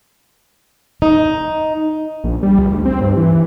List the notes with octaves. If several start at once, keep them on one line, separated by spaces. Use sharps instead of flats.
D#4
A#1
G3
C#2
D2
C4
G2
E3
E3